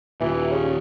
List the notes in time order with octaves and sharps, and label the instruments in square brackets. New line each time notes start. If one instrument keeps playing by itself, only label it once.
[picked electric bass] D#2 A#2 [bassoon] E3
[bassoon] C#3